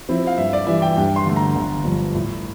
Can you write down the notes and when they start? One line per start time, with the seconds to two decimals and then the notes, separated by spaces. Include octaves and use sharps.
0.09 F3 C4 E4
0.27 F5
0.38 G2 E5
0.53 D5
0.67 E3 G3 E5
0.82 G5
0.97 G2 G5
1.16 C6
1.26 D3 A3
1.36 A#5
1.55 G1
1.85 G2 F3
2.15 A2